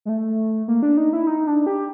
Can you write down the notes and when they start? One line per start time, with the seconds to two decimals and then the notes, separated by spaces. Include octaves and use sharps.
0.05 G#3
0.09 A3
0.68 A#3
0.82 D4
0.97 D#4
1.13 E4
1.27 D#4
1.47 D4
1.66 G4